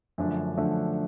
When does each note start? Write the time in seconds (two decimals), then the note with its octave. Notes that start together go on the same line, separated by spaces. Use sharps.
0.18 F#2 D3 F3 A3 D4
0.57 F#2 D3 F3 A3 D4